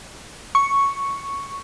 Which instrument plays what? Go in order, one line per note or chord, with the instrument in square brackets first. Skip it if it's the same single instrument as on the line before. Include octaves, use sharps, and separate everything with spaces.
[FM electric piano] C#6